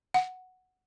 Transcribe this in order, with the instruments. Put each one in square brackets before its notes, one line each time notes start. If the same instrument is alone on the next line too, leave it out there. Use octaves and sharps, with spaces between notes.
[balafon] F#5